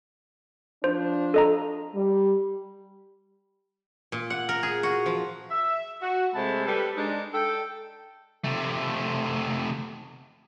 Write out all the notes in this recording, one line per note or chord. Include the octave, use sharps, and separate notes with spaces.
F3 D4 C5
A4 D#5 A#5
G3
A#2
F#5
A#4
G#4
F#4
F3
E5
F#4
C3 G#3 A3 C5 A5 B5
G3 A4 B4
G#3 D4 D#4
A4 G5
C3 A3